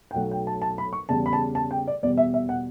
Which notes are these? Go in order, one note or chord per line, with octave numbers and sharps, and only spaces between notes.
G5
B1 B2 F#3 A3 F#5
G5
A5
A5
B5
C#6
E2 C#3 G3 A5
B5
A5
A5
G5
D5
E2 B2 G3 D5
E5
E5
F#5